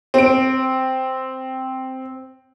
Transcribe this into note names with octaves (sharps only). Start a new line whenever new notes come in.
C4 D7